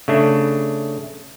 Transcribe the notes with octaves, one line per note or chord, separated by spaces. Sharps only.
C#3 A3 D4